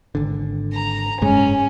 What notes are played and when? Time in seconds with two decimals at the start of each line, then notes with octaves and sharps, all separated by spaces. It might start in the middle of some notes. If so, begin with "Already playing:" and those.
0.15 G#1 D3
0.74 A#5
1.22 F#1 G#2 G#3 C#4